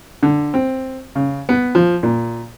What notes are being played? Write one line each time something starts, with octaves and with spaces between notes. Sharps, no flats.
D3
C4
C#3
B3
F3
A#2